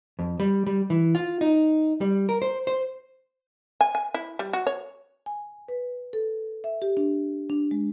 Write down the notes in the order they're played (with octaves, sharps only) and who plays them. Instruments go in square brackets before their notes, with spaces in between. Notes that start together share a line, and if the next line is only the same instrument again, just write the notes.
[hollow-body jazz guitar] F2
G3
G3
E3
F4
D#4
G3
A#4
C5
C5
[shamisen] G#5
G#5
E4
G3
F#4
C#5
[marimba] G#5
B4
A4
E5
G4
D4
D4
G#3